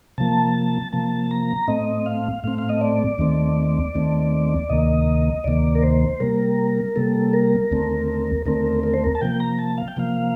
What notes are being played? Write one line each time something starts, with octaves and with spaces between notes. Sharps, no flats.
C3 F3 A#3 A5
C3 F3 A#3 A5
A#5
A2 A3 C4 D#5
F5
A2 A3 C4 F5
F5
D#5
D5
D#2 D#3 A3 C4
D#2 D#3 A3 C4
D2 C3 D#3 A#3 D#5
D2 C3 D#3 A#3 D5
A#4
C5
C3 G3 A#3 A#4
C3 G3 A#3 A4
A#4
D#2 D3 A3 C4
D#2 D3 A3 C4 A#4
A#4
C5
A#4
A5
C3 F3 A#3 G5
A#5
A5
F5
G5
C3 F3 A#3 F5